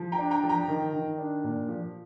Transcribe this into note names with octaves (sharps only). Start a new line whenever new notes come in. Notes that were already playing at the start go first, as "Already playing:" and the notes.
Already playing: F3
G5 A#5
D4
G5 A#5
F3
G5 A#5
D#3
D#3
D4
A#2
F3